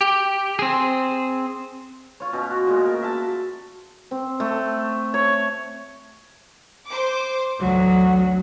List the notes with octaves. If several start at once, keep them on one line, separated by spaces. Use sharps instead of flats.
G4
C4 G#4
F4 C#5
B2 C#4
F#4
A#2 G#3
A#4
E5 A5
C4
A3
C#5
C5 D6
A1 D2 F#3